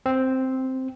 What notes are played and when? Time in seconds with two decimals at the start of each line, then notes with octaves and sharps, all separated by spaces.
0.06 C4